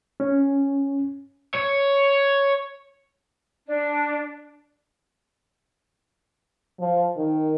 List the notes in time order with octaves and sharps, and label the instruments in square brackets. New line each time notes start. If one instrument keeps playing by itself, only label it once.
[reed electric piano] C#4
[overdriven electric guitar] C#5
[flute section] D4
[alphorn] F3
D#3